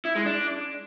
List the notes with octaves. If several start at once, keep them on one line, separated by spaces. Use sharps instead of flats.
E4
G#3
D4